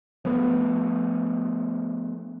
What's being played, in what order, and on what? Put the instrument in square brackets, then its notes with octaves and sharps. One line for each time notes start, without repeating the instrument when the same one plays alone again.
[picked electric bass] F3 A3 B3